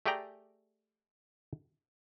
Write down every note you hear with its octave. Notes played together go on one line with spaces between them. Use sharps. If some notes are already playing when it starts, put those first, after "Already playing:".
A3 G4 G#4 D5 G5 A#5